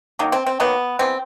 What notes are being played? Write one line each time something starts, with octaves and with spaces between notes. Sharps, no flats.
D#3 F#3 A#3
C4
C4
D#3 F#3 A#3 B3
E3 G3 B3 C4